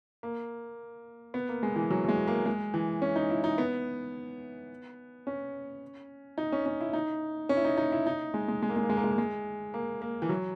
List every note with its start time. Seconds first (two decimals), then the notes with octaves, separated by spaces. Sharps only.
0.23 A#3
1.34 B3
1.49 A#3
1.63 G#3
1.76 E3
1.90 F#3
2.05 F#3
2.09 G#3
2.28 A#3
2.46 G#3
2.74 E3
3.02 C#4
3.16 D#4
3.30 E4
3.44 D#4
3.58 B3
5.27 C#4
6.38 D#4
6.52 C#4
6.66 C#4
6.81 E4
6.93 D#4
7.49 C#4
7.57 E4
7.65 D#4
7.77 D#4
7.92 E4
8.07 D#4
8.34 G#3
8.48 G#3
8.62 G#3
8.69 A#3
8.77 G#3
8.83 A#3
8.89 G#3
8.97 A#3
9.04 G#3
9.11 A#3
9.18 G#3
9.74 A#3
10.02 A#3
10.22 E3
10.29 F#3